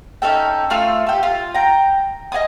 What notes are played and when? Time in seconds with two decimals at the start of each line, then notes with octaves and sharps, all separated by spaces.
0.22 C#4 D#4 A4 G5
0.70 A3 F4 F5 E6
1.07 G4 A4
1.23 F4
1.54 G5 A#5
2.32 D#5 F5 G#5 D#6